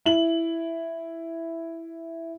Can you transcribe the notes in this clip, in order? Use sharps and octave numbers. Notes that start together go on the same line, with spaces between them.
E4 F#7